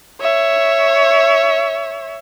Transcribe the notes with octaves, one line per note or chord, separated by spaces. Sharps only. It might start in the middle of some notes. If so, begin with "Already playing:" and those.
C#5 E5